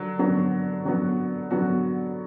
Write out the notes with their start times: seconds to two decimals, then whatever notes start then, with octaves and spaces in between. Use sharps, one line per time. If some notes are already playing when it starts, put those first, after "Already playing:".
Already playing: D3 F#3 F#4
0.19 D3 F#3 B3 F#4
0.85 D3 F#3 B3 F#4
1.51 D3 F#3 B3 F#4